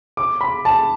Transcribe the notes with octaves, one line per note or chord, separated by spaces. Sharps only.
D6
B5
A5